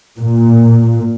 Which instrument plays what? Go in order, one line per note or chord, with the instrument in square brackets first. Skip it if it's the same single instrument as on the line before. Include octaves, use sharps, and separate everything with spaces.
[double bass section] A#2